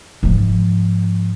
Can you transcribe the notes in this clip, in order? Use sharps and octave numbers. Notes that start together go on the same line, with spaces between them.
G#2 F3